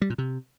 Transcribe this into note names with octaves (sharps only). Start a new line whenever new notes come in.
G3
A#2
C3